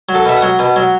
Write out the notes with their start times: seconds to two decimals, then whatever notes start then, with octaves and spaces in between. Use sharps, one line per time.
0.09 F#3
0.15 A4
0.26 B2 E5
0.37 F#5
0.42 F#3
0.59 B2
0.76 F#3